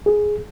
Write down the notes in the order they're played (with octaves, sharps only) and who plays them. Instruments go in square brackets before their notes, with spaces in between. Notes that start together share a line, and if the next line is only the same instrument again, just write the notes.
[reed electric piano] G#4